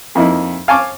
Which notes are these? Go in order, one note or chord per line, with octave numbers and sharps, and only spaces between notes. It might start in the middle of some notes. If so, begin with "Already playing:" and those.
F2 A#3 D#4 E4
F5 G#5 A5 C#6 D6